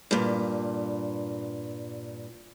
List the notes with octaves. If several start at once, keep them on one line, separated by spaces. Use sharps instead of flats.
G2 A#2